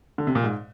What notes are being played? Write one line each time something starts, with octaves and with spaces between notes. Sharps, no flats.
D3
C3
A#2
G#2